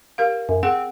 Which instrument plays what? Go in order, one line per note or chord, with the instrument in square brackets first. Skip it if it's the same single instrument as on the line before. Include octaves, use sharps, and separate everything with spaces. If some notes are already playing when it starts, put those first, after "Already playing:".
[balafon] G4 A#4 F5
[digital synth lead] F#2
[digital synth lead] C4 [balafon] G#4 F#5